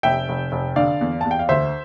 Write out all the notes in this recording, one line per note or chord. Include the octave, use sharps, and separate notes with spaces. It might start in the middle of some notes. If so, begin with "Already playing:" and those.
F1 E5 G5
F1
F1
D3 D5 F5
E2
A5
E2
G5
F5
D2 C5 E5